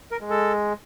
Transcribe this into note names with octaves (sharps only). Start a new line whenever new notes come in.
A#4
G#3
A4